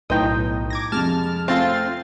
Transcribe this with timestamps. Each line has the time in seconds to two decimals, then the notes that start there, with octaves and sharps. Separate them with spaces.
0.10 B1 A2 D#4 B4 D#5 G5 C6
0.70 D6 G#6 A#6
0.92 F2 C3 G#3 A5 F6
1.48 A3 C4 F4 F5 A6 C7